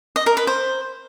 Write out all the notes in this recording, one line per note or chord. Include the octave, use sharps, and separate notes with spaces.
D#5
A#4
B4
C5